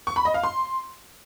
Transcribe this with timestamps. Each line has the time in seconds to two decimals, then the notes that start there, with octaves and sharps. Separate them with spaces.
0.07 C#6
0.16 B5
0.25 D#5
0.34 F5
0.43 C6